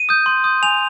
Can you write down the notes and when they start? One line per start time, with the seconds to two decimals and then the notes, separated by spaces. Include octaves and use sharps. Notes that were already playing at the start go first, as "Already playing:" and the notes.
Already playing: D#7
0.09 D#6 G6
0.26 C6
0.44 D#6 G6
0.63 G#5 F7